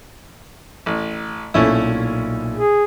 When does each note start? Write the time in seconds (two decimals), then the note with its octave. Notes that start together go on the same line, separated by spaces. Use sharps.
0.86 A1
1.54 B1 A#2 A3 C#4 E4
2.55 G#4